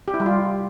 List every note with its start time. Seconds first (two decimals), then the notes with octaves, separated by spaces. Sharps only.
0.08 G4
0.14 E4
0.20 G3
0.26 F4